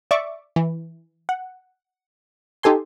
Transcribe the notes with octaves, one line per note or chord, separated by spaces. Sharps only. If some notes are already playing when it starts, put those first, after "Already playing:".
D5 E5 C#6 D6
E3
F#5
D#4 G4 A4 G#5 C6